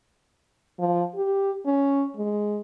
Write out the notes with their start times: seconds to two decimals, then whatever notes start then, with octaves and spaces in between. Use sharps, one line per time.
0.79 F3
1.15 G4
1.66 C#4
2.17 G#3